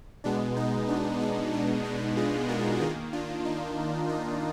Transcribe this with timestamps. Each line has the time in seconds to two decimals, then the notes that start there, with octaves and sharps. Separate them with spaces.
0.24 B2 G#3 B3 D4
0.57 D#4
0.88 D4
1.21 D#4
1.52 D4
1.84 D#4
2.17 F4 G#4
2.49 F#4 A#4
2.81 D#3 A#3 F4 G#4
3.13 D4 F4
3.45 D#4
4.09 D#4